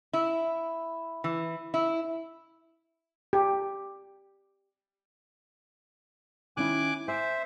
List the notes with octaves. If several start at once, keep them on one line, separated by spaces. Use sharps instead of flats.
E4
E3
E4
G4
D#3 C#4 E4 G#5 D6 F#6
C5 E5 G#5